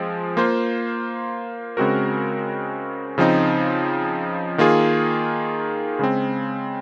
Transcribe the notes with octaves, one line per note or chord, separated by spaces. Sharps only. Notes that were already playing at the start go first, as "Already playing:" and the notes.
Already playing: F3 G#3 C4
A#3 F4 C5
C#3 G#3 C4 F#4 A#4
C#3 F3 C4 D#4
D#3 A#3 F4 G#4
C#3 G#3 C4